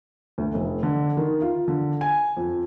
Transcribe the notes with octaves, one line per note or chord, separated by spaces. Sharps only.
D2
F1
D3
D#3
F4
D3
G#5
F2